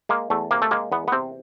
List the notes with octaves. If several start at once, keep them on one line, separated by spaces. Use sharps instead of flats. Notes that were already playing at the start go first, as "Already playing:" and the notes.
G#3 A#3
E2 A3
C3 A#3
A3
G#3 A#3
E2 B3
B3
C3 C4